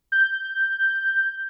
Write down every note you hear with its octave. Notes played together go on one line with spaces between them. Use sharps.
G6